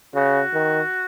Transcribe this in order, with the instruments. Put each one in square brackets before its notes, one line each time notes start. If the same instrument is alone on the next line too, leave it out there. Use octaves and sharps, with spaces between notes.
[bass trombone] C#3 [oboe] F#4
[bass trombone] D#3